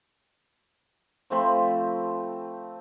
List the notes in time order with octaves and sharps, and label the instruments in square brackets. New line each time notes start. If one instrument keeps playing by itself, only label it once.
[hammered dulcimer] F3 A3 C4 B5